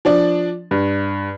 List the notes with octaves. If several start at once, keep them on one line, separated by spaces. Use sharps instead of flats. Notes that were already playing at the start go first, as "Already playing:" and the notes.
F3 D4 D5
G2